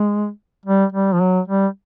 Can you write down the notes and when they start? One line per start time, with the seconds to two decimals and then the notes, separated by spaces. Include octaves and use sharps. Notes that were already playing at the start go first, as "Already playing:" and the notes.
Already playing: G#3
0.65 G3
0.92 G3
1.14 F3
1.21 F#3
1.48 G3